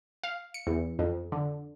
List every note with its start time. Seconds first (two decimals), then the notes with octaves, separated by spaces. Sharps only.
0.23 F5
0.54 C#7
0.67 E2
0.99 F2
1.32 D3